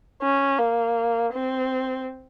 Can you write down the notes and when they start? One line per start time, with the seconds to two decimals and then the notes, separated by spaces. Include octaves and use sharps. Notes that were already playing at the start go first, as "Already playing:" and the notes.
0.22 C#4
0.59 A#3
1.34 C4